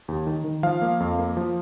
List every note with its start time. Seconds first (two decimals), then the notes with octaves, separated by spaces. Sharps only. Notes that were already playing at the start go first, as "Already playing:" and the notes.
0.08 D#2
0.27 D#3
0.44 D#3
0.63 F3 F5
0.82 A#3
1.00 F2
1.19 A#3
1.37 F3